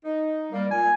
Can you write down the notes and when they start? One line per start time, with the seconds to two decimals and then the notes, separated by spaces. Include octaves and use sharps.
0.05 D#4
0.52 G3 A#3
0.71 A#2 G#5